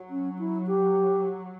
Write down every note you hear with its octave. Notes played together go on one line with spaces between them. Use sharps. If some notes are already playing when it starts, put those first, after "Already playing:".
Already playing: F#3
C#4
E4
G4